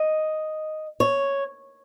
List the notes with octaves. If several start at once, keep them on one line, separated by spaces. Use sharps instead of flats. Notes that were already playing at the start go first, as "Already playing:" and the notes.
Already playing: D#5
C#5